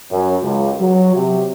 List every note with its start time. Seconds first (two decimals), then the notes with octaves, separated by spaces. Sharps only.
0.11 F#2
0.43 C#2
0.81 F#3
1.15 C3